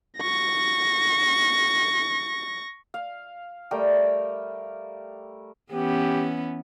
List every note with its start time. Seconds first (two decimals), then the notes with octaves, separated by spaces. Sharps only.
0.20 C#6 A#6
2.94 F5
3.71 G3 A3 A#4 G5
5.72 E3 B3 C#4 G4